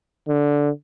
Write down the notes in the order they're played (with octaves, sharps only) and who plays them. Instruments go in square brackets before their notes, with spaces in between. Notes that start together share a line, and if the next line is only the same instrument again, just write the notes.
[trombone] D3